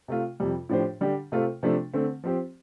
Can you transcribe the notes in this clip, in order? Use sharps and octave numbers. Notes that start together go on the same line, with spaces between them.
C3 A3 F4
F2 C3 G3
A2 F3 D4 G4 C5
D3 G3 D4 G4
C3 A3 F4 A4 C5
C3 F3 A3 D4
D3 A3 C4
F3 C4 G4 C5